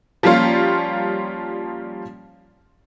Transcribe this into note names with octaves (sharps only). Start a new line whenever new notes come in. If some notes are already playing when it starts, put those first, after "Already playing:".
F3 G3 A#3 C#4 F4